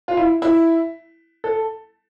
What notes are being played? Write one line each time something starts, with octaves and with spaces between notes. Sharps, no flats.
F4
E4
E4
A4